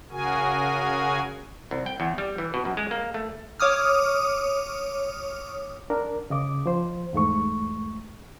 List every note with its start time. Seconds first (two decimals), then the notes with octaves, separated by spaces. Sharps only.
0.11 C#3 F#4 G#4 A#4 G#5
1.71 C2
1.86 G5
2.00 E2
2.18 G3
2.38 E3
2.54 B2
2.65 F#2
2.77 G#3
2.91 A#3
3.14 A3
3.60 C#5 D6 D#6 F6
5.90 D4 A#4
6.30 C#3 D#5 D6
6.66 F3 C5
7.13 E2 G#2 A3 C#6